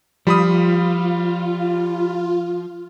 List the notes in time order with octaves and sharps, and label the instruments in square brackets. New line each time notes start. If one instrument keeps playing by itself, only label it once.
[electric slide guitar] F3 [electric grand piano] G3 B5 D#6 [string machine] F4